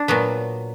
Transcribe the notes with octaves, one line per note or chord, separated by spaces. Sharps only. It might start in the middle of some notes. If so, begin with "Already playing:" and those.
Already playing: D4
A#2 F#3 B3